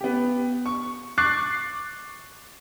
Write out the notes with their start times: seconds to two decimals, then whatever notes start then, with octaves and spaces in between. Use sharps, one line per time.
0.01 B3 G4
0.66 C#6
1.18 C#6 D6 F#6 A6 C7